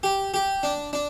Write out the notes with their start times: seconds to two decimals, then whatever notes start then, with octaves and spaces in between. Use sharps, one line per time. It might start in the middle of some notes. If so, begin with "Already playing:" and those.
0.03 G4
0.34 G4
0.63 D4
0.93 D4